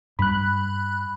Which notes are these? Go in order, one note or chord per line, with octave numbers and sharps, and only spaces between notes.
G2 G3 B5 F#6